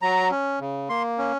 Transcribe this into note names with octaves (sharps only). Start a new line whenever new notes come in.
F#3 A#5
C#4
C#3
A#3 C6
C#4